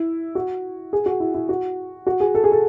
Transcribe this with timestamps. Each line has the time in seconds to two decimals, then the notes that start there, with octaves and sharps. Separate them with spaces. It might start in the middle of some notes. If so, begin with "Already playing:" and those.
Already playing: E4
0.35 F#4
0.93 G#4
1.06 F#4
1.20 E4
1.34 E4
1.49 F#4
2.07 F#4
2.20 G#4
2.35 A4
2.44 G#4
2.52 A4